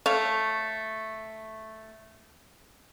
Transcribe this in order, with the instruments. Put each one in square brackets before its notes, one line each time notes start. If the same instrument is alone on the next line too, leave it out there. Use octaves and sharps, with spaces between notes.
[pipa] A3 C#5 F5